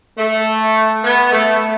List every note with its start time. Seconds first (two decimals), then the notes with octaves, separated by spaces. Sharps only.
0.18 A3
1.04 B3
1.32 A3